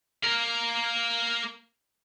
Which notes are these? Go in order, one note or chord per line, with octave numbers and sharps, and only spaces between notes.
A#3 A#4